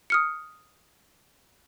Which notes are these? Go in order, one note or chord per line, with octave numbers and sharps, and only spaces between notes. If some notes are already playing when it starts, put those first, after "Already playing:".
D#6 F6 C#7